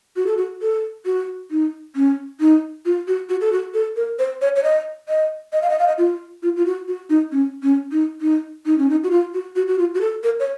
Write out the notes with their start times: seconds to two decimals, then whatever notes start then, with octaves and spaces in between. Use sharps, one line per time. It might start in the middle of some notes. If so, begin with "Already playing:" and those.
0.16 F#4
0.27 A4
0.37 F#4
0.62 A4
1.06 F#4
1.51 D#4
1.95 C#4
2.40 D#4
2.85 F4
3.07 F#4
3.29 F#4
3.41 A4
3.52 F#4
3.74 A4
3.96 A#4
4.19 C5
4.42 C#5
4.56 C#5
4.64 D#5
5.09 D#5
5.53 D#5
5.62 F5
5.70 D#5
5.79 F5
5.88 D#5
5.98 F4
6.43 F4
6.56 F4
6.66 F#4
6.88 F#4
7.10 D#4
7.32 C#4
7.63 C#4
7.92 D#4
8.21 D#4
8.66 D#4
8.78 C#4
8.90 D#4
9.04 F#4
9.11 F4
9.34 F#4
9.56 F#4
9.68 F#4
9.79 F4
9.95 F#4
10.01 A4
10.23 A#4
10.40 C#5